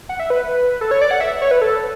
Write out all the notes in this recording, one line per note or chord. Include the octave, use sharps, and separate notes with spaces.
F#5
E5
B4
A4
C#5
D5
F#5
E5
C#5
B4
A4